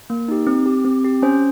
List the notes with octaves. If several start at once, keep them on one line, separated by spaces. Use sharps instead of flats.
A#3
D#4 G4
C4
G4
C4
G4
C#4 C5